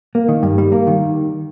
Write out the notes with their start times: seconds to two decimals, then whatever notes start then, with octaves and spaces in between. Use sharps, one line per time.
0.15 A#3
0.28 D#3
0.43 G2
0.58 G3
0.72 A#3
0.87 D#3